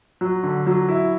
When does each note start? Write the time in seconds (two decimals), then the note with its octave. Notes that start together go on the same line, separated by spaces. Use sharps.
0.21 F#3
0.43 D3
0.67 F#3
0.89 E4